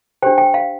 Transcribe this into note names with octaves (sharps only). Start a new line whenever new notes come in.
D4 G4 C5 G5
G5
F5